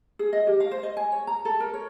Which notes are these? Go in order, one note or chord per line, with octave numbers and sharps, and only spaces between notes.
G#4
D#5
G4
F5
C5
D#5
G#5
C#5
A#5
A4
A#4
C#5